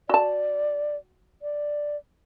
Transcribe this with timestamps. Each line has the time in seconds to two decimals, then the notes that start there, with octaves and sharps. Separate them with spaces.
0.09 F#4 D5 A5
1.42 D5